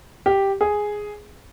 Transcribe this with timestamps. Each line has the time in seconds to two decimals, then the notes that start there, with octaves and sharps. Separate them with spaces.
0.26 G4
0.61 G#4